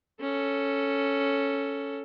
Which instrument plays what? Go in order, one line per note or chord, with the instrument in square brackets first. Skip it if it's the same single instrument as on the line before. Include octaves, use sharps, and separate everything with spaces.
[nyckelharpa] C#4 A4